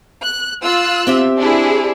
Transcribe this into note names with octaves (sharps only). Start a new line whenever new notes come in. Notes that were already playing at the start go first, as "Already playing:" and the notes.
F#6
F4 E6 F#6
C4 G4 E5
D4 E4 G#4